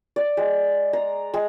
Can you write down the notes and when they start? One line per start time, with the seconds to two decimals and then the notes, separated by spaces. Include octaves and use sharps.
0.16 D5
0.37 G#3
0.93 A#5
1.34 G#3